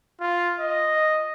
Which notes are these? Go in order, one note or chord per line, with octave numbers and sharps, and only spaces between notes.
F4
D#5